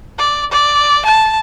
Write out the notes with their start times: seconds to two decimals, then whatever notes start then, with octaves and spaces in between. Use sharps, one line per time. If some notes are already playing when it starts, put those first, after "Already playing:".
0.19 D5
0.51 D5
1.06 A5